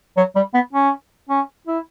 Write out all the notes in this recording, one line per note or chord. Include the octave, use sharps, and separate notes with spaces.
F#3
G3
B3
C#4
C#4
E4